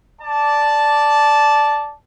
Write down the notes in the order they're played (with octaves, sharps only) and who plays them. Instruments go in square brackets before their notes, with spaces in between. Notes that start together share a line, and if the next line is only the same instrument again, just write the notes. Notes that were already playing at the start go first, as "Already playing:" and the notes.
[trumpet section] D5 A5